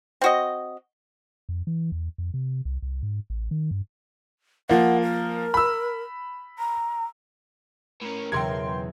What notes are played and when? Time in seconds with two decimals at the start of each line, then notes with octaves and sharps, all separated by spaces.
0.21 C4 F#4 D#5
1.49 F2
1.67 E3
1.92 E2
2.18 F2
2.34 C3
2.65 C2
2.82 C2
3.03 G#2
3.30 A1
3.51 D#3
3.71 G2
4.69 F3 A#3 F#5
5.02 A#4
5.54 B5 E6
6.59 A#5
8.01 A2 C#4 A#4
8.32 B1 E2 C#3 G5 A#5 C6 G#6